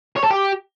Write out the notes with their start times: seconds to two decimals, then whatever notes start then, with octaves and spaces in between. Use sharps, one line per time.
0.17 C#5
0.24 A4
0.31 G4